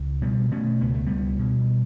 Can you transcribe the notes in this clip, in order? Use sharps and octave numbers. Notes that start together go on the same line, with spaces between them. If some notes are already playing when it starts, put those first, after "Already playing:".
Already playing: C#2
B2 G3 B3
B2 A3 C#4
C#2 B3
A3
C#2 G3 B3
B2